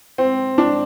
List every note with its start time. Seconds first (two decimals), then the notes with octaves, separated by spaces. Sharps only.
0.18 C4
0.58 D4